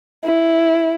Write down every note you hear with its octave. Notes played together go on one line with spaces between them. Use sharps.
E4